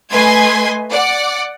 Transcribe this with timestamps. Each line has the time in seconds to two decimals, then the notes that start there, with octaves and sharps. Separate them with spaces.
0.12 A3 B4 D#5 G#5 C6 G#6
0.91 D5 F#5